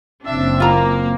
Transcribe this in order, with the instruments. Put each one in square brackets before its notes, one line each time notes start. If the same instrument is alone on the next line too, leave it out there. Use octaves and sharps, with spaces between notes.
[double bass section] F#1 C4 [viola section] D4 E5
[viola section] A#3 [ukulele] F4 A#5